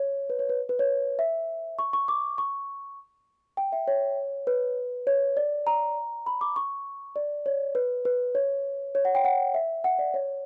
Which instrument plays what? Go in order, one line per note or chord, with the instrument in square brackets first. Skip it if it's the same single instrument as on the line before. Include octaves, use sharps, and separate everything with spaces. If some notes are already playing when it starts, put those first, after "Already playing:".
Already playing: [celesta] C#5
B4
C#5
B4
B4
C#5
E5
C#6
C#6
D6
C#6
G5
E5
C#5
B4
C#5
D5
A#5
B5
D6
C#6
D5
C#5
B4
B4
C#5
C#5
F#5
G5
F#5
E5
F#5
D5
C#5